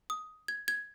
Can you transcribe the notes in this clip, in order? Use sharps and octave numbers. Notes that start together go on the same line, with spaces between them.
D#6
G#6
G#6